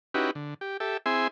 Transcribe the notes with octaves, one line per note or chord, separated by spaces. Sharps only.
C#4 D#4 E4 F#4 G4 B4
D3
G4
G4 A4 E5
C4 E4 G#4 E5 G#5 C6